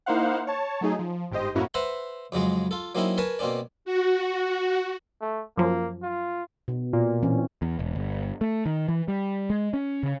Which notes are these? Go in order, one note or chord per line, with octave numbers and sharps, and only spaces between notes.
A#3 D#4 E4 C5 F5 F#5
C#5 A5
F#3 A3 D#4 G#4
F3
G1 G#2 G4 C5 D#5
F#2 A2 A#3 C#4 E4 F#4
B4 C5 E5 F#5 A#5
F2 C#3 F#3 G#3
F4 A4
F#3 A#3 C4 C#4 D#4 E4
A#4 B4 C#5 G#5 A5
B2 A#3 C4 C#4 D5
F#4
A3
F#2 F3 A#3
F4
B2
A#2
E3 C4 C#4
E2
E1
G1
A3
D#3
E3
G3
G#3
C#4
C#3